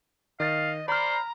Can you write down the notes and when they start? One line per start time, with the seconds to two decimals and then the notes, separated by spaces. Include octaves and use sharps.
0.40 D#3 D#5 F5 A6
0.88 C5 D5 A#5 B5 F6